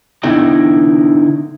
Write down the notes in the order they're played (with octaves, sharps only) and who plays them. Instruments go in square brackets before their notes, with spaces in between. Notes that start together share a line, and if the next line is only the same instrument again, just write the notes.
[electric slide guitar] D3 B3 D#4 E4 D#5 G5